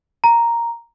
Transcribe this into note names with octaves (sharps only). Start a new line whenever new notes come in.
A#5